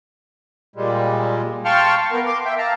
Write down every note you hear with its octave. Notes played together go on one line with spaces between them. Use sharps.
A#2 G3 G#3
F5 G5 A5 C6 C#6 F6
B3 A#4
C6 D6
E5 G5
F5 A5 A#5